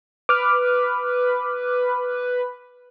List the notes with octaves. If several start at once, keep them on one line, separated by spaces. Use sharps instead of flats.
B4 D6 F6